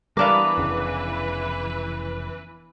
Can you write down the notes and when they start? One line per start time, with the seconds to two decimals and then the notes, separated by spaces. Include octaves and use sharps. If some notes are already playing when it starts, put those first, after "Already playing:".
0.17 E3 G3 B3 D4 A#4 B4 F5 D6
0.58 F1 C#3